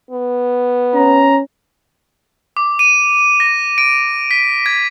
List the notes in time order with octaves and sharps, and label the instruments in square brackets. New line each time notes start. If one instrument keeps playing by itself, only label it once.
[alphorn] B3
[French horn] C#4 [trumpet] A#5
[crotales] D6
D#7
A#6
D7
B6
G#6